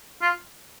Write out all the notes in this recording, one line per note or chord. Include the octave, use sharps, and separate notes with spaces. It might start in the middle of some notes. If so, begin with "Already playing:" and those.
F4